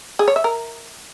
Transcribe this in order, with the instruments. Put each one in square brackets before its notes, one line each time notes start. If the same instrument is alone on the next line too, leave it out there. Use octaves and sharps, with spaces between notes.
[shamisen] G#4
C#5
E5
A#4